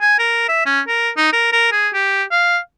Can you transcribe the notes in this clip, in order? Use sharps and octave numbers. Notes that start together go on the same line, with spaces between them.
G#5
A#4
E5
C#4
A#4
D#4
A#4
A#4
G#4
G4
F5